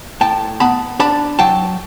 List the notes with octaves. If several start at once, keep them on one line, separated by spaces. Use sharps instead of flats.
A2 G5 A5
B3 A5 B5
D4 A5 B5
F#3 G5 A5